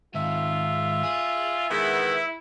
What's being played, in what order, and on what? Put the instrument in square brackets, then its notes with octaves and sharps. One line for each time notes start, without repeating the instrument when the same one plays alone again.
[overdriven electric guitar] G#2 D#3 [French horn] F4 [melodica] E5
[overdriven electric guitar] G#4
[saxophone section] D#3 G#3 B3 [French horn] E4